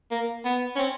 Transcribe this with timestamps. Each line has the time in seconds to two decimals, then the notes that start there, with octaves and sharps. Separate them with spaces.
0.11 A#3
0.45 B3
0.76 C#4
0.79 C4